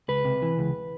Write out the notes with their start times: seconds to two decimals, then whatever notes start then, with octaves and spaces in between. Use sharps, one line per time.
0.08 C#2 B4
0.25 C3
0.42 E3
0.59 C#2